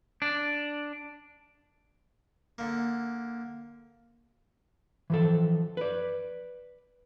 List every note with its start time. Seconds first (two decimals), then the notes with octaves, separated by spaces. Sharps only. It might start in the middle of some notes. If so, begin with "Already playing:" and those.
0.22 D4
2.58 D3 A#3
5.10 E3 F3 A4
5.77 B4 D5